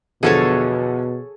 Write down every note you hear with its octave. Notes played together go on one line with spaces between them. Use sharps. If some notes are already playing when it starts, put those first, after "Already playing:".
E2 B2 D3 F3 G#4 A4 C#5